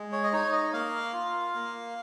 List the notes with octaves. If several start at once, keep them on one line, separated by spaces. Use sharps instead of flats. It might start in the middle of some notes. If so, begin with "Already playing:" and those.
Already playing: G#3
C#5
D#5
D#4 C#5
D#5
A#3 F5
F4
A#3